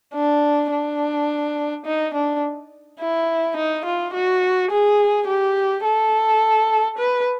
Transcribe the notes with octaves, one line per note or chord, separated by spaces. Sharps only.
D4
D4
D#4
D4
E4
D#4
F4
F#4
G#4
G4
A4
B4